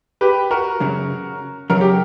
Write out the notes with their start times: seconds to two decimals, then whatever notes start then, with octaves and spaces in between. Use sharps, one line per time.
0.21 G4 B4
0.51 F#4 A#4
0.80 F#2 C#3 F#3
1.70 F#2 C#3 F#3 A#4
1.81 G4